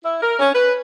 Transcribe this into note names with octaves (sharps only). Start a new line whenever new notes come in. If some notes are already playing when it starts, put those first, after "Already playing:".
E4
A#4
C#4
B4